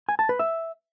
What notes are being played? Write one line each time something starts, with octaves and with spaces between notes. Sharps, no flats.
G#5
A5
B4
E5